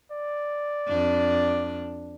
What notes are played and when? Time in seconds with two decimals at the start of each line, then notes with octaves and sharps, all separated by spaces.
0.12 D5
0.88 F2 D4